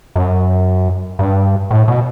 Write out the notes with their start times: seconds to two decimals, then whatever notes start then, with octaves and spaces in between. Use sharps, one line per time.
0.16 F#2
1.19 G2
1.71 A2
1.88 B2